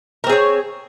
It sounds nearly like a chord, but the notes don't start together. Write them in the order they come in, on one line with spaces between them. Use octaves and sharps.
A#4 C4 G#4 C#5